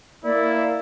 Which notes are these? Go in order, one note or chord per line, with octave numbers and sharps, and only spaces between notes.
A#3 E4 D5